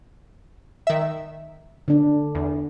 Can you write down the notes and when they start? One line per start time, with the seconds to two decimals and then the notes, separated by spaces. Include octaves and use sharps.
0.87 D#3 E5
1.88 D3 D4
2.35 E2